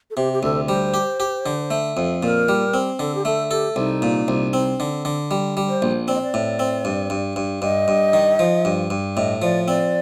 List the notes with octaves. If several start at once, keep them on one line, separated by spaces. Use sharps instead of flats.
A4
C3 G4
G4
D2 A4
G3 C5
G4
G4
D3
A3
F2
A#2 A#4
G3
C4
D3 A4
G4
A3 A4
G4 A4
C2 D#4
A#2
C2
C4
D3
D3
G3
G3
C5
A#1
C4 D5
D#5
D5
A2
C4
G2
G2
G2
G2 D#5
G2
D#3
F3
G2
G2
A2 D#5
F3 D5
C4 D5